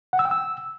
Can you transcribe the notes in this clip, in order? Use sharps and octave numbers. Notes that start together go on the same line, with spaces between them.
F#5
E6
G5
E6